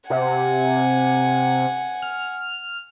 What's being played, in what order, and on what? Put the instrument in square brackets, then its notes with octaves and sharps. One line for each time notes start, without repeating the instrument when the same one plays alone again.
[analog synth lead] C3 [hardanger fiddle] F#5 G#5
[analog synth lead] F6